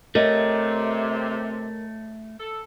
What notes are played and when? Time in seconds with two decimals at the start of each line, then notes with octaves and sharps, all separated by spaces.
0.15 C3 A3 A#4 C#5 D#5
2.39 A4